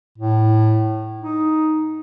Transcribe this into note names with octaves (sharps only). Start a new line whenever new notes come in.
A2
D#4